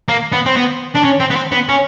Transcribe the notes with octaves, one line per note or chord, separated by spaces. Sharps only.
A#3
B3
C4
B3
D4
C#4
C4
B3
C4
B3
C#4